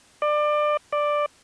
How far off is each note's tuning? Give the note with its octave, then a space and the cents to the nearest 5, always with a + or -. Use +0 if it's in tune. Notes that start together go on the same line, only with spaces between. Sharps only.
D5 +25
D5 +5